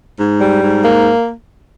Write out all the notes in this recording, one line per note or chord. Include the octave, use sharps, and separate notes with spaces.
G#2
G3
G#2
A#3